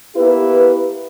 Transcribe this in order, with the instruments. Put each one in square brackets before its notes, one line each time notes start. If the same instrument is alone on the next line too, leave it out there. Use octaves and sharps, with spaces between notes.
[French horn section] A#3 B3 E4 G4 B4